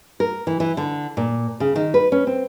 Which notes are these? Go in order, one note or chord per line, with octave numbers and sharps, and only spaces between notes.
A#4
E3
E3
D3
A#2
C#3
D#3
B4
C#4
C4